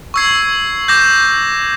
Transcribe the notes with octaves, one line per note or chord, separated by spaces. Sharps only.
C#6 E6 G#6 C7
D6 G6 A#6